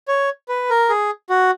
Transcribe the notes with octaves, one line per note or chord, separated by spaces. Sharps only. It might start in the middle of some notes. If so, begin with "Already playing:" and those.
C#5
B4
A#4
G#4
F#4